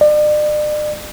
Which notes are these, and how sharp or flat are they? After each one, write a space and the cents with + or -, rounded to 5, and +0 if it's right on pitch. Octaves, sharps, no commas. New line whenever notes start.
D5 +40